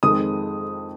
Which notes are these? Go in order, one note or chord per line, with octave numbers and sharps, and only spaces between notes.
F2 D#3 G#3 C4 D#6